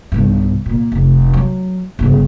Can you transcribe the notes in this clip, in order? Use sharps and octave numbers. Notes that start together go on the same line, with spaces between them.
B1 G2
A#2
F1
F#3
G1 C#3